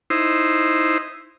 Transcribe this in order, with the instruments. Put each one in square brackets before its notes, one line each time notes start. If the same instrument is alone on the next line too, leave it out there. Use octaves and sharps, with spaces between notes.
[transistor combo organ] D#4 E4 C5